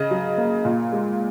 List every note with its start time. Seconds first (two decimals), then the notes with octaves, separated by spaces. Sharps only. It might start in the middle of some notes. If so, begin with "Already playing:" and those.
Already playing: C#3 D#5
0.11 F#3
0.37 A#3
0.65 A#2
0.92 G#3